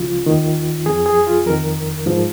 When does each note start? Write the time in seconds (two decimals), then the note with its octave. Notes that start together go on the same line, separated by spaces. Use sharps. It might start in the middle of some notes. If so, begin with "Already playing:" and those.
Already playing: C#2 C#3 F3 F4
0.26 D#2 D#3
0.86 F2 F3 G#4
1.06 G#4
1.27 F4
1.46 F2 D#3 A#4
2.06 G#2 F3